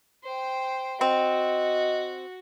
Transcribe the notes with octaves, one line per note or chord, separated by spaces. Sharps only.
C5 G5
C4 F#4 D#5